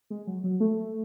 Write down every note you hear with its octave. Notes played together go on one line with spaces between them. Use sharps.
G#3
F#3
F#3
A3